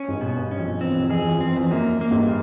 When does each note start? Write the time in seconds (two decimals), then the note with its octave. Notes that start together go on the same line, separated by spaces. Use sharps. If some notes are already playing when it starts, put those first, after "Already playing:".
Already playing: C#4
0.08 G#2
0.12 G2
0.21 B2
0.36 G2
0.51 C#4
0.58 F2
0.81 E2 C4
0.91 F2
1.00 E2
1.10 F2 G#4
1.20 E2
1.28 F2
1.37 E2 C4
1.47 F2
1.56 E2
1.71 F#2 A#3
2.01 A#3
2.11 G#2
2.16 G2